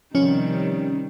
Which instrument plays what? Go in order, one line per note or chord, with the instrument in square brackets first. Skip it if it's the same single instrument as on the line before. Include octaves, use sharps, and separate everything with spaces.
[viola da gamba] C3 D#3 G3 [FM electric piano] F3 C#4